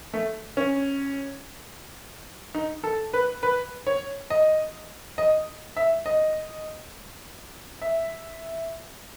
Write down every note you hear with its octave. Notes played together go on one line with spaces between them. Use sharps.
A3
C#4
D#4
A4
B4
B4
C#5
D#5
D#5
E5
D#5
E5